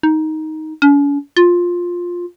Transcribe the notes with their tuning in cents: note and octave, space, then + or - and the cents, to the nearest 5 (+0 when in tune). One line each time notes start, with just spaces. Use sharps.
D#4 +10
C#4 +45
F4 +10